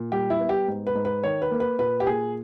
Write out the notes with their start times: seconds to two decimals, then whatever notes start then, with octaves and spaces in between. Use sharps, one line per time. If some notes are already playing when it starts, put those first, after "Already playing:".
Already playing: A#2
0.12 G3 G4
0.30 E4
0.40 B3
0.49 G4
0.68 G#2
0.87 B4
0.95 G#2
1.05 B4
1.23 D#3 C#5
1.42 B4
1.51 A#3
1.60 B4
1.79 A#2 B4
2.00 G4
2.07 A#2 G#4